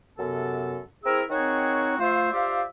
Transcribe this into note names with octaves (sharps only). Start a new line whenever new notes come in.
F#2 C3 B3 A4
C4 E4 G#4 A#4 E5 E6
D#3 C4 D#4 F#4 G#4 C#5
F3 A3 F4 C5 E5 F5
F4 G4 C5 D5 E5 F5